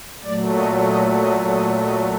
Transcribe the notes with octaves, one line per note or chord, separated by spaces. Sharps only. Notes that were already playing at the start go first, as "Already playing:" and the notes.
A#2 F#3 A3 D5
D#5
D#5
D#5
D#5
D#5